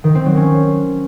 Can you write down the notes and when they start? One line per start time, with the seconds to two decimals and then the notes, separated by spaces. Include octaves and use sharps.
0.04 D#3
0.15 C4
0.26 F#3
0.37 C#4